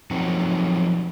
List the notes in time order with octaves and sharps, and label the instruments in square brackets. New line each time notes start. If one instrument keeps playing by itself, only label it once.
[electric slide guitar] F3 F#3 C4 D#4